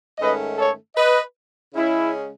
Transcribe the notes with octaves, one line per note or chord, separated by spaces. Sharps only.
G#2 D#3 A3 C#4 B4 D#5
A4 C#5
B4 D#5
C#3 G#3 C#4 E4